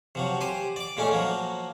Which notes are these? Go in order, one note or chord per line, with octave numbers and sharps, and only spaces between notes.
C3 F3 F#3
G4 C5 G#5
D5 D6
A#2 G#3 A3 C#4
F3 F#3 A#3